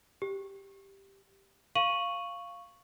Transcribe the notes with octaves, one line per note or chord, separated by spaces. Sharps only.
G4
F5 C#6 D#7 F#7